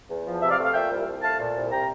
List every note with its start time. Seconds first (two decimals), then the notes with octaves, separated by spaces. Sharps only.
0.09 E2
0.25 F3
0.42 C3 E5
0.50 D5 F5
0.58 A3
0.65 F5
0.74 A#2 E5 G5
0.90 C2
1.07 C2
1.23 A3 F5 A5
1.39 A#2
1.55 C2
1.72 C3 G5 A#5